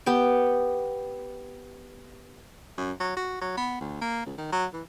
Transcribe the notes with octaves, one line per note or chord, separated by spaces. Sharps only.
B3 G4 G5
F#2
F#3
F#4
F#3
B3
D2
A#3
C#2
D#3
F#3
E3